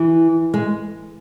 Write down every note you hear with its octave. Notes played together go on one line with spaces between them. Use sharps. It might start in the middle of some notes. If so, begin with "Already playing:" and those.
Already playing: E3
G#3